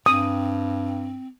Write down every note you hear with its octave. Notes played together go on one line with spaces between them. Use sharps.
G2 C4 D#6